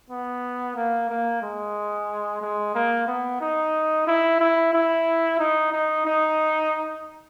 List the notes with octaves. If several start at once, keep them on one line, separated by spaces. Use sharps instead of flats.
B3
A#3
A#3
G#3
G#3
A#3
B3
D#4
E4
E4
E4
D#4
D#4
D#4